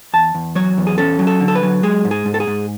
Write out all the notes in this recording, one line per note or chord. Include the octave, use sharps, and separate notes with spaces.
E2 A5
E2
F#3 C#5
E2
G#4
C#4 A4
F#3
A4
D3
A4
B4
F#3
G#3 G#4
G#2
G#4
G#2
A4
G#4
G#2